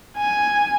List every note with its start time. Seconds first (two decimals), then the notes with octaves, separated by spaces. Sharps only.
0.18 G#5